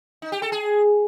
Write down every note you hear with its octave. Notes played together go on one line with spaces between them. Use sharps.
D#4
G4
A4
G#4